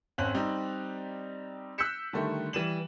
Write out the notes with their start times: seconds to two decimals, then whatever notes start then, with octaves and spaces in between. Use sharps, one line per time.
0.18 G#1 C4 C#4 F#6 F#7
0.34 G3 C4 D#4 G4
1.78 E6 F#6 G6 B6 C#7 E7
2.13 D3 D#3 G3 A3
2.53 E3 G3 D#7 E7 F#7